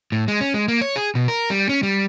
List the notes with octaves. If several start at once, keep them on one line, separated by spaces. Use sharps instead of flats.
A2
G#3
C#4
G#3
A#3
C#5
G#4
B2
A#4
G3
C#4
G3